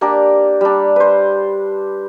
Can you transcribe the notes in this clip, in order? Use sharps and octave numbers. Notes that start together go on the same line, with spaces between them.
A#3 D4 G4 A#4
G3 D4
B4 C5